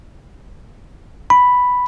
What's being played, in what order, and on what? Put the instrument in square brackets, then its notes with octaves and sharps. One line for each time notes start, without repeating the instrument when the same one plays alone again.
[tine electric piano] B5